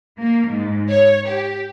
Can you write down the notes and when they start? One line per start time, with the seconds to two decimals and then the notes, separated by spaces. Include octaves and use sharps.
0.18 A#3
0.48 G#2
0.89 C#5
1.26 G4